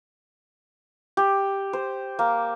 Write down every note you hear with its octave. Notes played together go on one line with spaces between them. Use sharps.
G4
C5
A#3